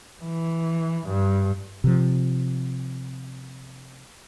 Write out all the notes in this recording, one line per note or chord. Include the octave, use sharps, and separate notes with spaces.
E3
G2
C3 F3